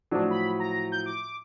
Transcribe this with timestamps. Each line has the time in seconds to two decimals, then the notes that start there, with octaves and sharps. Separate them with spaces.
0.11 A2 F3 F#3 D4
0.31 B5
0.60 A#5
0.92 G6
1.06 D6